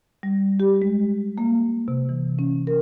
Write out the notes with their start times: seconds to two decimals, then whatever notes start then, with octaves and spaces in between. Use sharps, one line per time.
0.23 G3
0.60 G4
0.82 G#3
1.38 A#3
1.88 C3
2.09 E3
2.39 C#4
2.67 A#4